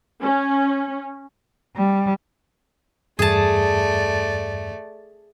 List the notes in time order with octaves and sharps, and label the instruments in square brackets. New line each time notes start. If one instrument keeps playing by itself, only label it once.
[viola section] C#4
[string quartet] G3
[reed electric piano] E2 G2 [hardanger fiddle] A3 D5 [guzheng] G#4 A5